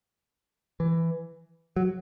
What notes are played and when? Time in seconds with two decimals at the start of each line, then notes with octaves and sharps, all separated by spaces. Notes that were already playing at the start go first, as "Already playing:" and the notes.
0.80 E3
1.76 F#3